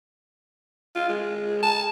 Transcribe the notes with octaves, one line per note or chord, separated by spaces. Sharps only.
F4
G#3
A5